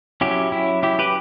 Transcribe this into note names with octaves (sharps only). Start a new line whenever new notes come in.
F#3 C#4 E4 G4
E4
E4 G4
G4 B4